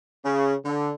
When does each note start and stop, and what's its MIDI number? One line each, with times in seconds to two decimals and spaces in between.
0.25 0.55 49
0.65 0.91 50